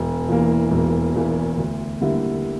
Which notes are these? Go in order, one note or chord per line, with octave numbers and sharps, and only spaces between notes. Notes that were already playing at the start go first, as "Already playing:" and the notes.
Already playing: E1
E2 E3 A#3
E1
E2 E3 A#3
D2
D3 G3 A#3 E4